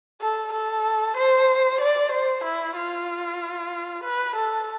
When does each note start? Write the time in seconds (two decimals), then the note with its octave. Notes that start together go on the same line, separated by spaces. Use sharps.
0.21 A4
0.53 A4
1.17 C5
1.81 D5
2.12 C5
2.44 E4
2.76 F4
4.04 B4
4.36 A4